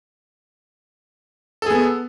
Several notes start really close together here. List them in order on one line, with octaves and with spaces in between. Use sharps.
A4 G#4 B3